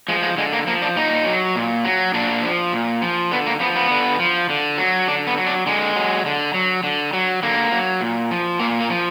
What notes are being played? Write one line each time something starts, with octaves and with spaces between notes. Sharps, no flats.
F3 G#3
G#3
D3 G#3
A#3
F3 A#3
D4
A#2 D#4
F#3
A#2
F#3
A#2 D4
F3
A#2
F3
D3 B3
A#3
F3 B3
B3
D3
F3
D3
F#3
D3 D4
B3
F#3
D4
D3 G#3
F#3
D3
F#3
D3
F#3
D3 A#3
F#3
A#2
F3
A#2 A#3
A#3
F3